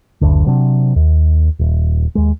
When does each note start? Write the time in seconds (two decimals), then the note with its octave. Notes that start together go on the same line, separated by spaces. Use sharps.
0.21 F#1 D2 D3
0.46 C3 F#3 C4 D4
0.96 D#2
1.59 D#1
2.15 D#2 G#3